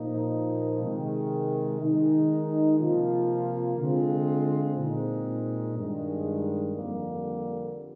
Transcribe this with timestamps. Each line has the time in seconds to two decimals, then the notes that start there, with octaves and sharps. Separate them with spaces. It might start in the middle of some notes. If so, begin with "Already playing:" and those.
Already playing: A#2 F3 A#3 D#4
0.82 C3 D#3 G#3
1.81 D#3 G#3 D#4
2.80 C3 F3 A#3 F4
3.79 D3 G#3 C4 F4
4.77 A#2 G#3 C4 D#4
5.76 G2 D#3 G#3
6.75 F2 D3 G3 A#3